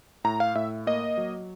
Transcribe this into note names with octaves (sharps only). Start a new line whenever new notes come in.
A2 A#5
F5
A2 E5
A#3 D#5
F#3